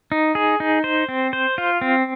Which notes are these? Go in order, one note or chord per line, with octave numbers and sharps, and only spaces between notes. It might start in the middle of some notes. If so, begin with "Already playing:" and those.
D#4
G#4
D#4
C5
C4
C5
F4
C4